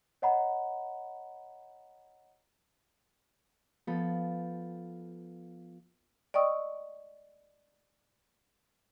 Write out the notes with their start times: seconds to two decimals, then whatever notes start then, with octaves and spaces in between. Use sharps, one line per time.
0.22 C#5 D#5 F#5 A#5 B5
3.87 F3 B3 A4 B5
6.34 D5 D#5 G5 C#6 D#6 E6